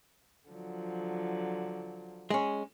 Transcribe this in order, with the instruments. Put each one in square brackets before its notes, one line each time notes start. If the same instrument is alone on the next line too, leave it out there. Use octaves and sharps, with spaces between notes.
[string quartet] D3 F3 F#3
[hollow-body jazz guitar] G#3 C#4